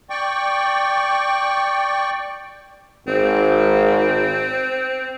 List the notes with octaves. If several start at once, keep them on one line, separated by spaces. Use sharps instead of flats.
D5 G5 C#6
G#1 C4